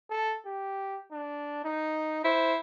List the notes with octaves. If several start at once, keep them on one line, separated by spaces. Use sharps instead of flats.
A4
G4
D4
D#4
E4 C5